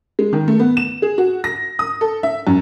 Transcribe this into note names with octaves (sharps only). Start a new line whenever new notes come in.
G#3
D#3
A3
B3
E7
G#4
F#4
A#6
D#6
A4
E5
F#2